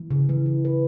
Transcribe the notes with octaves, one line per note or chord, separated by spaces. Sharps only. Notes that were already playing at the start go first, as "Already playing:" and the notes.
Already playing: E3
C#3
E3
E4
B4